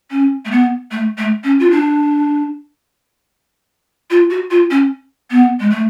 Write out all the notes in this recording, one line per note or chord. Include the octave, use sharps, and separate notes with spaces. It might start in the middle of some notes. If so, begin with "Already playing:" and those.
C#4
A3
B3
A3
A3
C#4
F4
D4
F4
F#4
F4
C#4
B3
G#3
A3